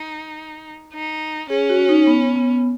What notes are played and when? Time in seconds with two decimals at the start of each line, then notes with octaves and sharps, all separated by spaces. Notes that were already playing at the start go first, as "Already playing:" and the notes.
Already playing: D#4
0.93 D#4
1.50 C#4 G#4
1.69 F#4
1.89 D#4
2.07 B3
2.36 B3